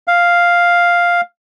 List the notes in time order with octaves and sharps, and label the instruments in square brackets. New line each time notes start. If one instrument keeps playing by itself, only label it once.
[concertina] F5